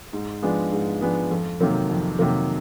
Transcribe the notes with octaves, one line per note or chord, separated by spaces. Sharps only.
G#2
F3 G#3 B3 D4
G#2
F3 G#3 B3 D4
F2
C3 D#3 F#3 A#3
F2
C3 D#3 F#3 A#3